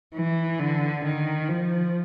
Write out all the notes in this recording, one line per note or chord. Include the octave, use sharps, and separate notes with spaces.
E3
D3
D#3
F3